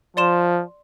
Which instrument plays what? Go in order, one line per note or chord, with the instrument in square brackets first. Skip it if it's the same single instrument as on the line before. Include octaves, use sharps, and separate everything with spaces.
[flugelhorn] F3 [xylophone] D5 C6 E7